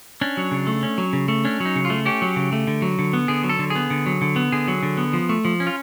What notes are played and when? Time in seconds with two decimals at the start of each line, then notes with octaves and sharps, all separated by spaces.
0.21 C#4 D4
0.37 F#3
0.51 C#3
0.67 A3
0.83 C#4
0.98 F#3
1.13 C#3
1.28 A3
1.45 C#4 D4
1.60 F#3
1.65 D#4
1.76 C#3
1.85 F4
1.90 A3
2.06 C#4 G4
2.22 F#3
2.36 C#3
2.53 A3
2.67 D3
2.82 F#3
2.99 D3
3.13 B3
3.28 D3 G#4
3.44 F#3
3.50 A4
3.59 D3
3.70 G#4
3.76 B3
3.90 D3
4.06 F#3
4.21 D3
4.36 B3
4.52 D3 G#4
4.68 F#3
4.83 D3
4.97 B3
5.13 F3
5.29 A3
5.45 F3
5.60 C#4
5.67 F4